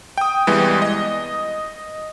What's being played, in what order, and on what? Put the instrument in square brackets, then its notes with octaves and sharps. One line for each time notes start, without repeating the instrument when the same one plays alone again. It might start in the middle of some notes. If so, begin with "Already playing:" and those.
[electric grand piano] G5 D#6
C2 E3 G3 G#3 B3
D#5